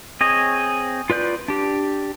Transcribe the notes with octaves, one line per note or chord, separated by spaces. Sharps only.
C4 G#4 C#5 D#5
F4 B4 D5 G6
D4 G4